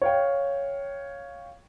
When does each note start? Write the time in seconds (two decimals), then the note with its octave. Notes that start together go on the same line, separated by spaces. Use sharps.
0.02 C#5 F5 G5